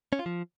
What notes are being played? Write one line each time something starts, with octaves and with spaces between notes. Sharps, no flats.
C#4
F4
F3